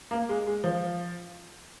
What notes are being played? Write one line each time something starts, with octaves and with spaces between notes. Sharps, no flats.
A#3
G#3
G#3
F3